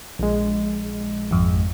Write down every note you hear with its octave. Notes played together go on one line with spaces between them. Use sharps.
A#1 G#3
G#1 F2